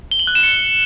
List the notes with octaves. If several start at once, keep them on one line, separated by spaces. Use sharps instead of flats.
G7
F#7
F#6
E7
C#7